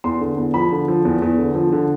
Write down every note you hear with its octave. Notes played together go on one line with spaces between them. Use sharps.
E2 C6
D3
E2
F3 B5
D3
F3
E2
E2
D3
F3
D3